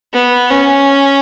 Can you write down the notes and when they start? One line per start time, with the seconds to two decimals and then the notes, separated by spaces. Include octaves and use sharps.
0.13 B3
0.51 C#4